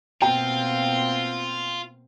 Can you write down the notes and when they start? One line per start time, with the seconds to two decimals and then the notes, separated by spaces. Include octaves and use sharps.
0.22 B2 A#3 C4 F4 G5